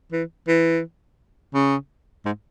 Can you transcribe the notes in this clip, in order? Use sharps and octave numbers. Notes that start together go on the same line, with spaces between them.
E3
E3
C#3
G#2